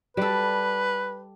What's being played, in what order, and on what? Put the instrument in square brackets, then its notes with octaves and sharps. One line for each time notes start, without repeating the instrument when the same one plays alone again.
[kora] G3 A4 [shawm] B4